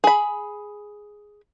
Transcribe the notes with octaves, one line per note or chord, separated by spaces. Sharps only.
G#4 B5